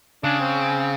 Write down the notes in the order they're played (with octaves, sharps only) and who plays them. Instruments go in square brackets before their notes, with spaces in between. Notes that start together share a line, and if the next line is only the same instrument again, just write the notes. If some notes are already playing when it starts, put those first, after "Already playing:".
[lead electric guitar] C#3 [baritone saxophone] D4
[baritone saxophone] C4